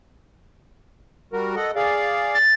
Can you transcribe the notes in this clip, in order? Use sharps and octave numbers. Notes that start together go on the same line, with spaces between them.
G3 F#4 A#4
A4 D#5 F#5
G#4 D5 F5
A6